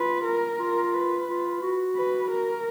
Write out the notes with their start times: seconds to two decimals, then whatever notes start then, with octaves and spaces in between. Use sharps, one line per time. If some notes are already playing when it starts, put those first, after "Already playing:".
Already playing: F4 B4
0.25 A#4
0.59 F4
0.94 B4
1.28 F4
1.62 F#4
1.96 B4
2.31 A#4